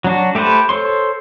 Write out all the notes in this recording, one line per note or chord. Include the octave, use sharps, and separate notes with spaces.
F#3 D4 F#4
A3 G4 A4 B4 C5
A4 C5 C#5 C6